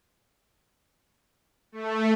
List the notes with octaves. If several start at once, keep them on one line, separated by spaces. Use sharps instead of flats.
A3